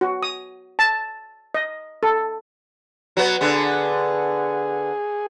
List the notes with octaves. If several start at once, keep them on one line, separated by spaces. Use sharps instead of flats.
F#4
D#6
A5
D#5
A4
F#3 B3
D3 B3 G#4